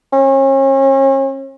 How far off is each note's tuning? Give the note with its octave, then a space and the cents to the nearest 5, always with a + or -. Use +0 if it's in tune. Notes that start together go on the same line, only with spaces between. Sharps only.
C#4 -40